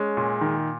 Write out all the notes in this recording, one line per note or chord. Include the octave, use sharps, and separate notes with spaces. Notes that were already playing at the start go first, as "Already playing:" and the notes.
Already playing: G#3 C#4
A#2
D#3